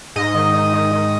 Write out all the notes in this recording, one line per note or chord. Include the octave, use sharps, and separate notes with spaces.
G#2 D#5
D#3
D#3
D#3
D#3